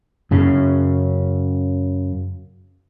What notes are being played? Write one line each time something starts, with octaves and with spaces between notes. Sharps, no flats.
F#2 C#3